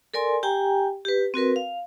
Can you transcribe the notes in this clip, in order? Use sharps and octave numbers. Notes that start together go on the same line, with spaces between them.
A4 A#4 D5 G#5 C6
G4 G5 G#5 A#5
G4 B4
C4 F#4 A#4 B4
F5